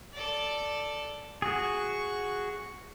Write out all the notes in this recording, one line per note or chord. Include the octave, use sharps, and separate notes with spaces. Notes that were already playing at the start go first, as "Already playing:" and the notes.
A4 D5
F#4 G#4 C#6